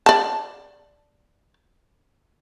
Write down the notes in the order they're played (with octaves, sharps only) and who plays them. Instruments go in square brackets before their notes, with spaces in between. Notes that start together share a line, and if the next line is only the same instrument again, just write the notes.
[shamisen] D5 A5